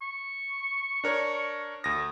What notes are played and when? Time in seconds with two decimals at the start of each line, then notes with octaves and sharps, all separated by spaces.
0.02 C#6
1.04 D4 A#4 C#5
1.84 D2 D#6 A#6